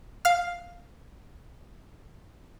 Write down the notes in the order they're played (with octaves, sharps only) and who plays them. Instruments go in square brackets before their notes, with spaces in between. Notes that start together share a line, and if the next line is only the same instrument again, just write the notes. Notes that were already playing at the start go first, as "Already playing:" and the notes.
[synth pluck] F5 F6